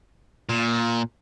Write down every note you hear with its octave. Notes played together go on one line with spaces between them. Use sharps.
A#2